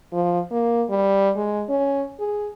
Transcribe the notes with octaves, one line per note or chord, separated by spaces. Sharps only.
F3
A#3
G3
G#3
C#4
G#4